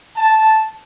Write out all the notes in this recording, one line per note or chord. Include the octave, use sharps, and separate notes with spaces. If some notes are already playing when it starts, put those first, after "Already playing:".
A5